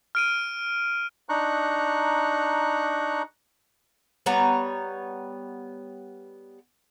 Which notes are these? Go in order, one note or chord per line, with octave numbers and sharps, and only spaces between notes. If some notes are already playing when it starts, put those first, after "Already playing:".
F6 D7 D#7
D4 D#4 A#5 C#6 F#6
G3 B3 C#5 A#5